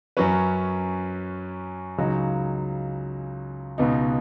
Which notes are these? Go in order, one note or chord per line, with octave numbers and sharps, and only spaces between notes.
F#2 F#3 C#4 B4
C#2 C#3 F#3 D#4
C#2 B2 B3 D#4